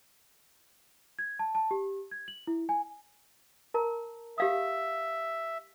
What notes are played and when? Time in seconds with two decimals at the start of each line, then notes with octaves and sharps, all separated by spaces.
1.19 G#6
1.39 A5
1.55 A5
1.71 G4
2.11 G#6
2.28 F#7
2.47 E4
2.69 G#5
3.74 A#4 A5 A#5
4.38 G4 E5 F5 D#6